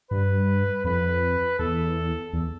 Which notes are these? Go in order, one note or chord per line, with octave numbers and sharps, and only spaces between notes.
G2 B4
F2 B4
E2 A4
E2